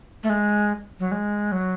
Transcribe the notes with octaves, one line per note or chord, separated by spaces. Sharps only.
A3
G#3
F#3
G#3
F#3